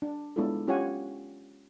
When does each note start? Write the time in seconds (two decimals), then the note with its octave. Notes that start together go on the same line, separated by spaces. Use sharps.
0.02 D4
0.36 G#3 B3 D4 E4 F4 A4
0.67 C#4 F4 G4 C#5 F#5 G#5